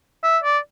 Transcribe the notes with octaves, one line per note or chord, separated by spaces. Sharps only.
E5
D5